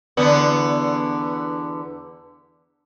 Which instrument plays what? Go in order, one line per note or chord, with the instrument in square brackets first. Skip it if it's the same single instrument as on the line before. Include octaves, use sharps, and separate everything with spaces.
[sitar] E2 D3 B3